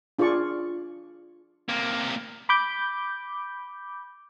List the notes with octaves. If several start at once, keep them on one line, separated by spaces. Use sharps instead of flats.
D4 F4 G#4 D5 C#6
C3 A#3
B5 D6 G6